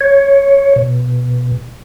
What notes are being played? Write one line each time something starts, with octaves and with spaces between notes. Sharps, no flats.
C#5
B2